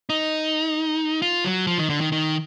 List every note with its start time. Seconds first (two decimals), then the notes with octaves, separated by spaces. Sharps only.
0.10 D#4
1.22 F4
1.45 F#3
1.67 F3
1.78 D#3
1.89 D3
2.01 D#3
2.12 D#3